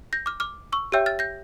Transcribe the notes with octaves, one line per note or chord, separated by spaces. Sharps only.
G6 A#6
D6 F6
D6 F6
C#6 E6
G4 C#5 E5 G5 E6 G6
F6 A6
G6 A#6